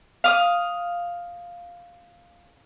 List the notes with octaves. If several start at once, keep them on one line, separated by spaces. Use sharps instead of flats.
F5 D#6